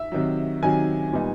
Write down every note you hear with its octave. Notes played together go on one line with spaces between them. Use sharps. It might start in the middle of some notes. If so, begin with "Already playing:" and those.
Already playing: E5
C3 D#3 F#3
C3 D#3 F#3 G#5
A#2 G3 B3 D#4